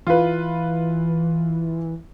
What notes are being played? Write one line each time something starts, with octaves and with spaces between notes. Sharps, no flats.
E3 F4 B4